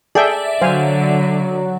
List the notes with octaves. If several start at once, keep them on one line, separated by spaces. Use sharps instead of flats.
G#4 A4 D5 E5 G5
D3 F#3 C5 F5 G#5